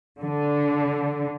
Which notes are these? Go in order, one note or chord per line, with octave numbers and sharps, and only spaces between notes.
D3